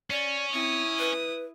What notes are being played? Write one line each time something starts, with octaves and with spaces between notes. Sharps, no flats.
C#4 D5
C4 E4 D#6
B4